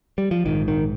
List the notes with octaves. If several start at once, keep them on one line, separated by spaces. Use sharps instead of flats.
G3
F3
A#1 G#2 D#3
D#3